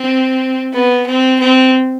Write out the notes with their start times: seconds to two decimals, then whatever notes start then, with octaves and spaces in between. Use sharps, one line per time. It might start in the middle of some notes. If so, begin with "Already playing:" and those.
Already playing: C4
0.73 B3
1.06 C4
1.39 C4